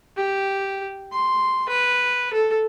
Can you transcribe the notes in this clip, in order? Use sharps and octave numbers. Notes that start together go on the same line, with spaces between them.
G4
C6
B4
A4